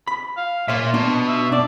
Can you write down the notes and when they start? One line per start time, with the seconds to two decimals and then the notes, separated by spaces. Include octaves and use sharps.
0.07 B5
0.37 F5
0.68 A#2 A#3 F4 C#5 E5
0.94 B2 D4
1.28 E5
1.52 D4 D5